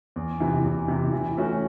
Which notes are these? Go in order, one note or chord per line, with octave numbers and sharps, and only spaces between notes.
E2
C3 E3
E2
C3 E3
E3
A3 C#4 F#4